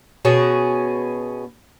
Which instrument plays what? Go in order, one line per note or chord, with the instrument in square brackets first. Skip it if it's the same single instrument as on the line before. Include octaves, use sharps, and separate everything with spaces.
[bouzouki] B2 C#4 G#4